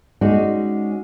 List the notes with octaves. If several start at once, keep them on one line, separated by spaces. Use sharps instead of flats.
G#3 C#4 D#4 F#4 D5